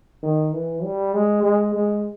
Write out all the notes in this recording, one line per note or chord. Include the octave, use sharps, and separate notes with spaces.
D#3
E3
G3
G#3
G#3
G#3